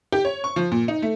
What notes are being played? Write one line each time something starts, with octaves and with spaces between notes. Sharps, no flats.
G4
C#5
C#6
F3
A#2
D#4
A3